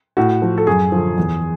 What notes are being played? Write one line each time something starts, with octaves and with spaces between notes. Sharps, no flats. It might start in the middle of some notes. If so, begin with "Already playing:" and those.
A2 F#4
F3
A4
F#2 G#4
D3 F3
E2